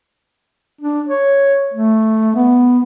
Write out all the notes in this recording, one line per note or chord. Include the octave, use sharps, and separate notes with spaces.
D4
C#5
A3
B3